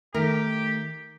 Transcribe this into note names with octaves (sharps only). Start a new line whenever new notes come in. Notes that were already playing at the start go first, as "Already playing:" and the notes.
D#3 A3 G4 A#4